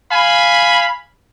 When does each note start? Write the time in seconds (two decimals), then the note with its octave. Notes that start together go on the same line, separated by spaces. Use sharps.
0.11 F5 G#5 B5